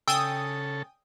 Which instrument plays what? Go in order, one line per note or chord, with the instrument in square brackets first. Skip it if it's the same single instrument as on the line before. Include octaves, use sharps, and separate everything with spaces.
[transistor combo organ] C#3 A4 [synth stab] G5 G#5 D#6 [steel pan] E6